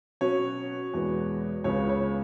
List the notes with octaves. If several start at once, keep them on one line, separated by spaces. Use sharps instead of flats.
B2 F#3 C#4 C#5
E2 B2 G#3 B3
C#2 C#3 G#3 B3 C#5
C#5